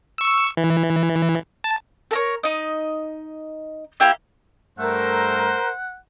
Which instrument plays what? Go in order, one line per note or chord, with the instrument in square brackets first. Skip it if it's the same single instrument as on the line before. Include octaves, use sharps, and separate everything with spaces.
[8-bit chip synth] C#6 E6
E3
A5
[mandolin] A4 A#4 C#5
D#4 D#5
A#3 E4 G4 E5
[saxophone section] G2 A3 [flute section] A#4 [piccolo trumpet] C5 [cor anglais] F#5